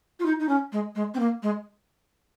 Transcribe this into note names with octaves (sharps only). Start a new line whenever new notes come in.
F4
D#4
D#4
C#4
G#3
G#3
C4
A#3
G#3